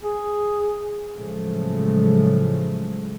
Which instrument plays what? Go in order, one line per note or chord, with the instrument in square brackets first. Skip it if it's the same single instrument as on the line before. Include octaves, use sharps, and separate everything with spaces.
[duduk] G#4
[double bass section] A2 C#3 F3 F#3 G#3 A3